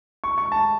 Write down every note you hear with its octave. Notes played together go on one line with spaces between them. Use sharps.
C#6
C#6
A5